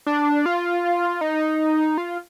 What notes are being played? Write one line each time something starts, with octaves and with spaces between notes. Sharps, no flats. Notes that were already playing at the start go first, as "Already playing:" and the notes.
D4
F4
D#4
F4